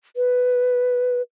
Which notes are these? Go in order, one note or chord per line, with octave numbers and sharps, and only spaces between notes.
B4